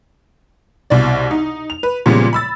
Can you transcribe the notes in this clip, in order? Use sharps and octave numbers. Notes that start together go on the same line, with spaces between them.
C2 B2 D5
D#4
F7
B4
A#2 C#3 F3 G3 G#3 B3
B5 E6 A6